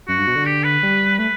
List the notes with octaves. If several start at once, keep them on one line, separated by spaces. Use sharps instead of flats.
F#2 F#4
G2
B2
D3
G4
B4
G3
A3 B4